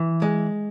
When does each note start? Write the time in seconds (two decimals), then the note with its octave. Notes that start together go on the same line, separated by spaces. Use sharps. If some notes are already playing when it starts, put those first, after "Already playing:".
Already playing: E3
0.22 G#3